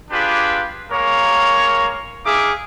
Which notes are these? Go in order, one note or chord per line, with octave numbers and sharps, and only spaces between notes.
D4 F4 G4 G#4 B4
G#3 A#3 A#4 C#5
D#4 G#4 E5 F5 D6